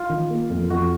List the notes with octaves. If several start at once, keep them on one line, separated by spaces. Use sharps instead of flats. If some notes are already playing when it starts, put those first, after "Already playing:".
Already playing: F4
D#3
A#3
F2
F2 F#4